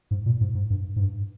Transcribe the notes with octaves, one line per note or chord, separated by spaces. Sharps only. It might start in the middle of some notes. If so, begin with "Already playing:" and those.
G#2
A#2
G#2
G#2
G2
G#2
G2